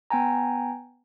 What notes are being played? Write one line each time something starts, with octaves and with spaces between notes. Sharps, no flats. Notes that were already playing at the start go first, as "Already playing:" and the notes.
B3 G5 G#5 A#5